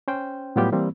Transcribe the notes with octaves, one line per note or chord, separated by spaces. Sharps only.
C#4 C5 G5
A2 F#3 G3 B3 F4 G4
E3 G3 A#3 C4